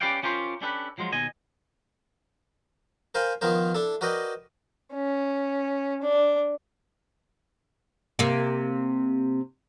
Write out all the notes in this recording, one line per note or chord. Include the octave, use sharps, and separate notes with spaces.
C#4 G4 B4 D5 F5 G5
C#4 F4 G4 A#4 C5
C#4 D4 G4 A4 B4
F3 F#3 G#3 F4
D#2 B2 D#5 G#5
A#4 C5 F5 G5 G#5 B5
D#3 F3 B3 A#4 C5
D4 E4 A4
F#4 A#4 B4 D5 D#5 G5
C#4
D4
C3 A#3